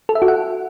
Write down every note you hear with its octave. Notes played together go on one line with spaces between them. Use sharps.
A4
E5
F#4
F#5